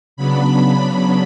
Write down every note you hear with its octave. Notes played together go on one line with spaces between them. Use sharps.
C#3 F#3 B3 D4 B5